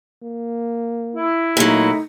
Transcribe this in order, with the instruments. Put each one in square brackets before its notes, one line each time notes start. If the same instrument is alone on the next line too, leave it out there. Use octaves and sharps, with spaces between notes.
[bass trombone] A#3
[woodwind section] E4
[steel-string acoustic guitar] A#2 F#3 [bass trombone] A3 [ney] D#4